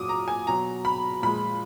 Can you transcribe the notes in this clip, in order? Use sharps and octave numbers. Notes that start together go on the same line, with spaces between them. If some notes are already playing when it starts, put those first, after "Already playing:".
Already playing: A#2 F#3 D6 D#6
A#5
G#5
B2 F#3 A#5
B5
A#2 F3 G#3 B5